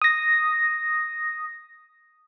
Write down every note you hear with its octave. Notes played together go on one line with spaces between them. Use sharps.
D#6 A#6